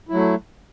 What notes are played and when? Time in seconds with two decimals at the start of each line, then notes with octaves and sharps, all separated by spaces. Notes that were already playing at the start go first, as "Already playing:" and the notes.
0.09 E4
0.12 F#3
0.14 A3